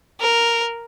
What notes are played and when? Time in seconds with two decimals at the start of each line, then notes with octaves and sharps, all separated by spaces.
0.21 A#4